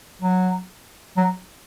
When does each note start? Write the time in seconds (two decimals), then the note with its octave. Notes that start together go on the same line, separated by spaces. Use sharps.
0.22 F#3
1.17 F#3